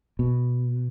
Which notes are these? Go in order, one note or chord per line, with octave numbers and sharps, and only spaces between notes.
B2